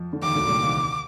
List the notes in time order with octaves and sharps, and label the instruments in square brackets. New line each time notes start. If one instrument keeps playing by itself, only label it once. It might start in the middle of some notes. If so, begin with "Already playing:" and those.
Already playing: [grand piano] F2 F3
D3
[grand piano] D#2 D#3 [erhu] D6
[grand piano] D2 D3
A#2
C2 C3
D#2 D#3